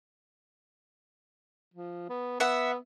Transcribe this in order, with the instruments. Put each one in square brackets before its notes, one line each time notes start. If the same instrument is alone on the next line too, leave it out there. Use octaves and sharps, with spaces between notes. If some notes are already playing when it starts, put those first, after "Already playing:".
[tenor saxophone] F3
B3
[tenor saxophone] B3 [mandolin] E5 F#5